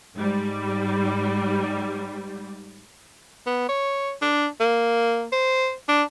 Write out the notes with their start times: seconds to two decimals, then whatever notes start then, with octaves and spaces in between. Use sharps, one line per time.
0.16 G#2 G3
3.47 B3
3.69 C#5
4.22 D4
4.60 A#3
5.33 C5
5.89 D4